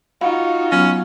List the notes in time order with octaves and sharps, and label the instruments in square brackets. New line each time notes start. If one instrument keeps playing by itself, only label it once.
[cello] D#4 F#4 [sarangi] F4 [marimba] F5 F#5 B5
[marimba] F#3 B3 [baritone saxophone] C#4